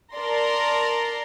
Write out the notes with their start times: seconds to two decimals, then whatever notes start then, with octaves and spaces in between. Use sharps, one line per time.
0.14 A#4 D5 A5 A#5 C6